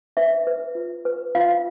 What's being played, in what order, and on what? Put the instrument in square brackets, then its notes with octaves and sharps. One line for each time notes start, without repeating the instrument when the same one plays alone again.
[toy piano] B4 E5
B4
F4
B4
F4 F5